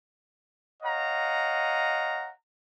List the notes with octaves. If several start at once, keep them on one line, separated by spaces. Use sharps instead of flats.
C#5 D#5 F5 F#5 A#5